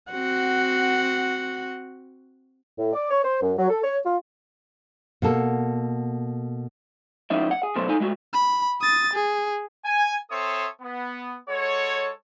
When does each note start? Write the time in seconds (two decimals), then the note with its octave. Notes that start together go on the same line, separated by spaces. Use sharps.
0.12 C4 F#4 F#5
2.78 A2
2.93 D5
3.10 C#5
3.23 C5
3.41 F#2
3.58 F#3
3.70 A4
3.83 C#5
4.04 F4
5.22 B2 A#3 A4
7.30 A2 F3 C#4 D#4 E5
7.51 F#5
7.63 G#4
7.76 F#2 B2 A3 C5
7.89 D#4 A4 G#5
8.00 G#3 A3 F#4
8.33 B5
8.81 D#6 A6
9.13 G#4
9.84 G#5
10.30 C4 A4 C#5 E5 C6 D#6
10.80 B3
11.49 G#3 F#4 A4 C#5